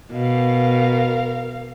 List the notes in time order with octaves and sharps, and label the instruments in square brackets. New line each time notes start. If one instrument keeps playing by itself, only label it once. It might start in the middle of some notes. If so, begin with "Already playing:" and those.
[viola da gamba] B2 [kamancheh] A#4 F5